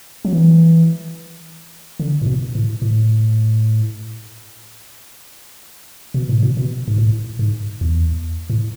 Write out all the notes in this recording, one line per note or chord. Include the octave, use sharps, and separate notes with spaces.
F#3
E3
D3
A2
B2
A2
A2
B2
A2
B2
B2
G#2
A2
G#2
E2
A2